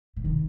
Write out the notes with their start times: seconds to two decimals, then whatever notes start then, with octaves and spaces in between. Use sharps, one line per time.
0.16 A#2
0.24 C3 D#3